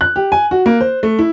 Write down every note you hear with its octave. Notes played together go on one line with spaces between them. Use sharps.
F#6
G4
G#5
F#4
A#3
C5
A3
E4